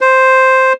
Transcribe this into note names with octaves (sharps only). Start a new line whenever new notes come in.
C5